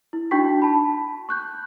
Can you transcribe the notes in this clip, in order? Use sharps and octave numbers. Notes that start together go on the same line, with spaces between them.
E4
D4 D#4 F#4 G5 C#6 B6
A5 B5
C#6 F#6 G6